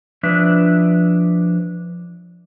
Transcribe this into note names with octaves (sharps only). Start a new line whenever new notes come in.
F3 D4 B4 E5